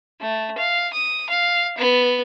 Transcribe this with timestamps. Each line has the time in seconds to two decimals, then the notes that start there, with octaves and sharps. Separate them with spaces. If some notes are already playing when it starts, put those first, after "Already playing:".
0.21 A3
0.58 F5
0.93 D#6
1.30 F5
1.78 B3